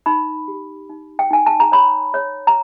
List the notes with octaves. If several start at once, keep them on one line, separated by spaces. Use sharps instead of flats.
D#4 B5
G4
D#4
G5
D#4 G#5
A5
A#5
C#5 B5
C#5
A#5